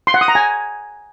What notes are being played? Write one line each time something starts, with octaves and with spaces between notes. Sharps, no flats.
C6
F#5
D#6
A#5
G#5